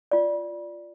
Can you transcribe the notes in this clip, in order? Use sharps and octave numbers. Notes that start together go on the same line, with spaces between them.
F4 D5